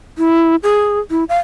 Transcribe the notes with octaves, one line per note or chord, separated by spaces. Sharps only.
E4
G#4
E4
F5